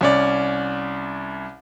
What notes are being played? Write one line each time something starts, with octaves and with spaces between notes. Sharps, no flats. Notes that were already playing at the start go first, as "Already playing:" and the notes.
C2 C#4 D5